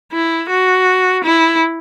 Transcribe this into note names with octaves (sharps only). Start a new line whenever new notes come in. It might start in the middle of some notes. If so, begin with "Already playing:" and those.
E4
F#4
E4